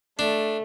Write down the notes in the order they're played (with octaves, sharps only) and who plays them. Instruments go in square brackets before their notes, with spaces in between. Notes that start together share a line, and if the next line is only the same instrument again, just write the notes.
[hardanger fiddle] A3 [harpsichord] D4